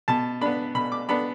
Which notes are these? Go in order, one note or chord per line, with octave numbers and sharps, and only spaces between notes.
B2 A5
B3 D4 B5
B2 B5
D6
B3 D4 B5